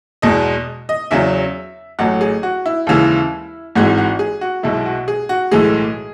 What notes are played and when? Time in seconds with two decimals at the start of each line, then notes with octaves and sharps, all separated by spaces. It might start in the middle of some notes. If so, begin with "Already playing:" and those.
0.22 E2 B2 G#3 D#5
0.89 D#5
1.11 E2 C#3 F#3 E5
1.99 A1 A2 F#3 F#5
2.21 G#4
2.43 F#4
2.66 E4
2.87 D#2 C#3 E3 G#3
3.75 G#1 G#2 E3 G#3 F#4
3.97 F#4
4.19 G#4
4.41 F#4
4.63 B1 B2 G#3 E4
4.86 F#4
5.08 G#4
5.29 F#4
5.51 B1 A2 E3 G#3 G#4